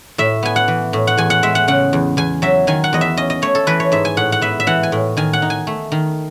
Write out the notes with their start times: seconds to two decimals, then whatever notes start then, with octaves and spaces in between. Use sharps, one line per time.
0.18 A2 E5
0.43 B3 G#5
0.56 F#5
0.68 E3
0.93 A2
1.07 F#5
1.17 E2 G#5
1.30 F#5
1.43 G#3 E5
1.55 F#5
1.68 C#3 F#5
1.93 E2
2.17 E2 G#5
2.42 F#3 E5
2.67 D#3 G#5
2.84 F#5
2.93 E2 D#5
3.01 E5
3.17 C#4 D#5
3.30 D#5
3.42 A3 C#5
3.55 A4
3.67 E3 B4
3.80 C#5
3.92 G#2 E5
4.05 G#5
4.17 A2 F#5
4.32 F#5
4.41 B3 E5
4.60 E5
4.67 E3 F#5
4.83 G#5
4.92 A2
5.17 D#3 G#5
5.33 F#5
5.42 D#4
5.50 G#5
5.67 A3
5.92 D#3